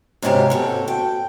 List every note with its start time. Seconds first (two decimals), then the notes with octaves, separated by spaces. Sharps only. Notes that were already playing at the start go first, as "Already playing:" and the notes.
0.22 G#2 C3 F3 C#4 F#4 G4
0.50 C4 F#4 A4
0.88 G5